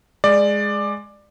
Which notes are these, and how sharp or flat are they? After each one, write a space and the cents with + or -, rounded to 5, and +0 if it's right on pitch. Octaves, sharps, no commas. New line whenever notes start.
G#3 +0 D5 +15